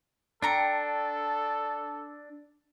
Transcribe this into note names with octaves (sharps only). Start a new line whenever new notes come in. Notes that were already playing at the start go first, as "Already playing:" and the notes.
D4 A4 G5 A#5 C#6